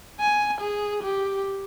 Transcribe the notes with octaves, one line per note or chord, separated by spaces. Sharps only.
G#5
G#4
G4